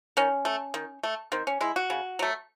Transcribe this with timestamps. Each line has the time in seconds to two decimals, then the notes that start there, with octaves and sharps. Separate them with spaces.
0.17 D#3 C#4
0.45 A3
0.74 D#3
1.03 A3
1.32 D#3 C4
1.47 C#4
1.61 G#3 E4
1.76 F#4
1.90 C#3
2.19 F#3 A3